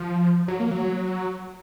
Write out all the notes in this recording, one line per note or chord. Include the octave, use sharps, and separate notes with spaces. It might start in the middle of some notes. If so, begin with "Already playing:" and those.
Already playing: F3
F#3
A#3
F#3